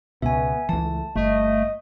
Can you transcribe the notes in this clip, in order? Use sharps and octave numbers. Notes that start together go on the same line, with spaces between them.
C#2 B2 B3 E5 G#5
C#2 E3 A3 A5
G1 A3 D#5